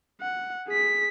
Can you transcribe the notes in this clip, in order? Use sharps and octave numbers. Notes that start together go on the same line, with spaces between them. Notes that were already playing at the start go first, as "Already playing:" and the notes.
F#5
G#4 B6